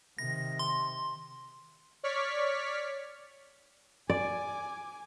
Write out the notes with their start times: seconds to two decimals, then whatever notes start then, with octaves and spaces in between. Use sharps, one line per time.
0.18 C3 D#3 A#6
0.59 C6
2.03 C#5 D5 C#6 F6 B6
4.10 D5 G#5 D6